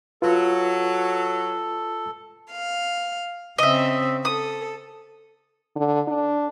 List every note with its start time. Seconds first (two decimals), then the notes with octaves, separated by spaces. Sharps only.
0.22 F#3 F4 A4 B4
2.51 F5
3.58 C#3 C4 D#5 E5
4.25 A4 D#6
5.76 D3
6.08 D4